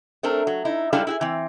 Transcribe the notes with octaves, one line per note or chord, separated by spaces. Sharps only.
A3 C4 D4 A#4
F#3
D#4 E4
G3 G#3 D4 E4 A4 F5
E4 F#4 G#4
E3 C4